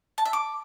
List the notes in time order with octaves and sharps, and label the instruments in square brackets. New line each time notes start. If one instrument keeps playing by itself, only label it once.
[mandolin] A5
E5
D6